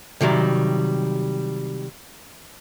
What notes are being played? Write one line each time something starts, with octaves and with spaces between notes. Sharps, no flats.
C3 D#3 F#3 G3